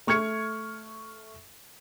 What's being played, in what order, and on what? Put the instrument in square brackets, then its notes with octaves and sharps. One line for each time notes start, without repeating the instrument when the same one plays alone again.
[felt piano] A3 C#6 F6 G#6 C#7